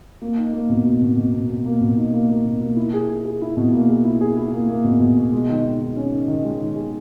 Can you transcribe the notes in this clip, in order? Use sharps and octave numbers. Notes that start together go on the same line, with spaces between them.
A#3
D#4
A#3
B2
B2
B2
B2
B2
B2
A#3
B2
D#4
A#3
A#3
B2
A#3
E4
G#4
G#4
G#4
E4
B2
A#3
G#4
E4
G#4
E4
A#3
A#3
B2
B2
B2
G#3
D#3
D#3
D#3
C#4
D#3
D#3
G#3
D#3
G#4